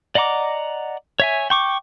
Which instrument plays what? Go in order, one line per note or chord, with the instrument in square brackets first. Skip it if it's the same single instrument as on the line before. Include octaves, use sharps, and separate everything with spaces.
[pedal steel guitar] D5 D#5 F#5 A#5 D6
C#5 E5 G#5
G5 C#6 D6